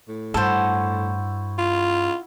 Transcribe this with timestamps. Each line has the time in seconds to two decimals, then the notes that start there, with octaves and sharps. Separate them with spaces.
0.08 A2
0.34 G2 E4 F#4 A4 C5
1.58 F4